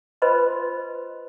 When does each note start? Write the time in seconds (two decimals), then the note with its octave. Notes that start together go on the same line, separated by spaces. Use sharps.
0.22 F4 B4 C5 D#5 B5 C6